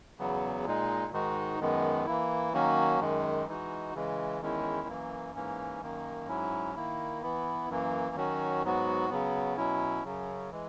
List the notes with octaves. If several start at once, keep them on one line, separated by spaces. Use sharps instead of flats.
E2 C#3 F#3 B3
A#2 G#3 D#4
G#2 D#3 G#3 D#4 F#4
F#2 D#3 G#3 B3
E3 A#3 E4
D#3 F#3 A#3 C#4 F#4
F#2 D#3 G#3
E3 G#3 D#4 F#4
C#3 E3 G#3
E2 D#3 G#3 C#4 E4
F#2 E3 A#3
G#2 E3 A#3 C#4
F#2 D#3 A#3
G#2 F#3 C#4 E4
D#3 A#3 E4
E3 B3 E4
F#2 E3 A#3
D#3 F#3 C#4 F#4
G#2 F#3 B3 F#4
C#3 F#3 B3
B2 F#3 C#4 E4
F#2 C#3 F#3
E3 G#3